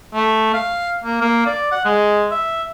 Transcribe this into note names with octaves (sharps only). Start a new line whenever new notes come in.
A3
F5
A#3
A#3
D5
F#5
G#3
E5